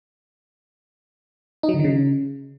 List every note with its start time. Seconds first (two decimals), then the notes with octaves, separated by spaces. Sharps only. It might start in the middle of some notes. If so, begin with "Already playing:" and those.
1.63 D#4
1.69 F#3
1.74 D3
1.79 D#3
1.84 C#3